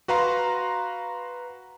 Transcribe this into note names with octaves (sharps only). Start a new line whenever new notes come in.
F#4 B4 F5 A#5 C6